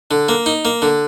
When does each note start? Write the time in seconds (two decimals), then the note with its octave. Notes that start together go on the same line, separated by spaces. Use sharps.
0.11 D3
0.29 A#3
0.46 D#4
0.65 A#3
0.82 D3